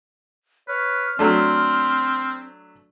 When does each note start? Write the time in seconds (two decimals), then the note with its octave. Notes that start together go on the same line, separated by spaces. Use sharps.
0.68 B4 C#5 F6
1.19 F#3 A3 C4 D4 C6